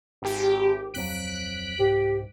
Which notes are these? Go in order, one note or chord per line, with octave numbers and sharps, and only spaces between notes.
G#1 G4
D1 F2 F#3 F#6 B6 D7
C2 G#2 G4